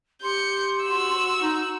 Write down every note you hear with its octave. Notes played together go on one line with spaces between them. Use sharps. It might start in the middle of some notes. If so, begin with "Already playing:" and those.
G4 C6 G6 C#7
F#4 E6
D#4